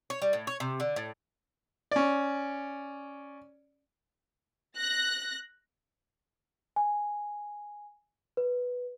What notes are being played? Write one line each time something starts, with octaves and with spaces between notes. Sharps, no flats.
C#5
G3
A2
C#5
C3
D3
A2
C#4 D5
F#6 A#6
G#5
B4